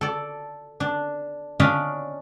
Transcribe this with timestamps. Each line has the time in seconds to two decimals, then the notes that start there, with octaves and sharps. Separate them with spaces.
0.01 A4 D5
0.80 D4
1.60 C#4 D4 D5 D#5 F5 B5